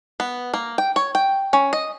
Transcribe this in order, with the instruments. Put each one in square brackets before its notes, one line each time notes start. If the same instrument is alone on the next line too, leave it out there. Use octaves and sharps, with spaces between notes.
[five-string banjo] B3
A#3
G5
C#5
G5
C#4
D#5